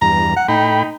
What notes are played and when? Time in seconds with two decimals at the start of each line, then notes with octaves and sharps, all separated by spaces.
0.02 E2 G2 A#5
0.36 F#5
0.48 A2 D#4 G5 B5